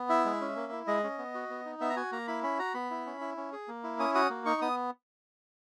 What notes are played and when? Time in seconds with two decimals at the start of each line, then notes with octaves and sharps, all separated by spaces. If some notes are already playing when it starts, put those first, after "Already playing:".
Already playing: B3
0.09 E4 E5
0.25 G#3
0.41 C#4
0.56 A#3
0.72 E4
0.87 G#3 D#5
1.04 C#4
1.18 B3
1.34 F#4
1.50 B3
1.66 D#4
1.81 B3 E5
1.90 A#5
1.96 F#4 G#5
2.12 A#3 A#5
2.28 E4 B5
2.43 C#4 B5
2.59 F#4 A#5
2.74 B3 B5
2.91 E4
3.06 C#4
3.21 E4
3.37 C#4
3.52 G#4
3.68 A#3
3.84 E4
3.99 C#4 D#6
4.15 F#4 D#6
4.30 A#3
4.46 D#4 C#6
4.62 B3 D#6